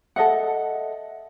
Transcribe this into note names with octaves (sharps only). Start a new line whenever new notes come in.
A4 D#5 E5 F#5